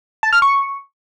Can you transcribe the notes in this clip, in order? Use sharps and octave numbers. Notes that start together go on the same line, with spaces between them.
A5
F6
C#6